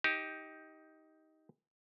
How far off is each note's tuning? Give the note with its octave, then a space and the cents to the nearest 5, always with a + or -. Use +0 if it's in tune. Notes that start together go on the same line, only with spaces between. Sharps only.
D#4 +15 G4 +0